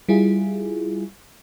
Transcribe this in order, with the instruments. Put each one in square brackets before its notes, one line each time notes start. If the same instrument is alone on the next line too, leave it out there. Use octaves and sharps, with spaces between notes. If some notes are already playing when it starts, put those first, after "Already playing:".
[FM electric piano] G3 E4 F4 G#4